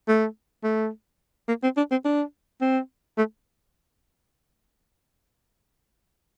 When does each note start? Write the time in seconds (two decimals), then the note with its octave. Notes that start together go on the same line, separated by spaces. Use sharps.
0.08 A3
0.63 A3
1.48 A#3
1.63 C4
1.77 D4
1.91 C4
2.05 D4
2.61 C4
3.18 A3